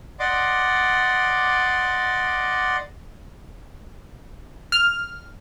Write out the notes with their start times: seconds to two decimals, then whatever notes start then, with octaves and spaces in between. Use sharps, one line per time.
0.20 D5 D#5 F#5 C6 D6
4.72 F6